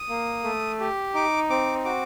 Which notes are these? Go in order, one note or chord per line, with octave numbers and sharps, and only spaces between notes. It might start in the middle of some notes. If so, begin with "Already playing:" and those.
Already playing: D#6
A#3
A3
G4
D#4 D6
C4 D6
F#4 D6